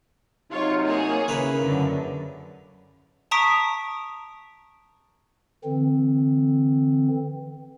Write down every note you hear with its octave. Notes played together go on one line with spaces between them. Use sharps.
C3 F#3 D#4 F4 C#5
A#3 G#4 C#5
C#3 E4 A#4 B4
F#2 D3
A5 A#5 C#6 D#6 B6 D7
D3 E3 C4